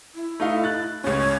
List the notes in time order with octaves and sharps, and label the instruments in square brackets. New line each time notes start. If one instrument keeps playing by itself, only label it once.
[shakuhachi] E4
[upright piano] A3 D#4 F5
F#6 A6
[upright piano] C#2 C#4 [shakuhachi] C#5